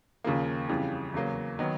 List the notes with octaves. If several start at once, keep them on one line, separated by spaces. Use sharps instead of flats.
D#2 C#3 F3 A#3
F2 C#3 E3 G3
E2 C#3 F#3 A#3
D#3 F#3 B3